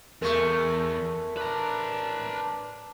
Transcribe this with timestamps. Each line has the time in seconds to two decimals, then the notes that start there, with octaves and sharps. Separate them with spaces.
0.22 E2 G#3 A3 A#4 C#6
1.37 D4 B4 A#5